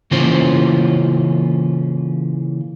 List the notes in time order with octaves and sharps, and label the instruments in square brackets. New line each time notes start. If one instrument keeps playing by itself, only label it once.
[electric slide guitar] C#3 E3 A#3 C#4 F4 C5